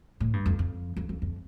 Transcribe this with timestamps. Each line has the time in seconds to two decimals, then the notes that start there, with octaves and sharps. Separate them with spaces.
0.20 A2
0.33 G2
0.46 F2
0.59 F2
0.97 F2
1.09 F2
1.22 F2